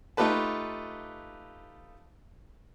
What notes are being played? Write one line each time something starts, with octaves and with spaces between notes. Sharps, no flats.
A3 D#4 F4 G4 B4 A5